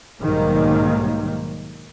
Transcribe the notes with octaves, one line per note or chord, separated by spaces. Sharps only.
B1 G#2 D#3 F#3 G3 A#3